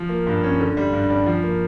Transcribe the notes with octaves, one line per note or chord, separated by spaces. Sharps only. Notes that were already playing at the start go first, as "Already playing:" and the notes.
Already playing: F3
A#3
G2
C#4
D3
G3
G2
D4
F3
A#3